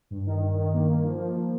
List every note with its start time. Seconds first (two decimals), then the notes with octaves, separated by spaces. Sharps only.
0.10 G2
0.26 D#3
0.41 D#3
0.58 D#3
0.74 A#3
0.89 A#3
1.05 F3
1.21 F3
1.37 F3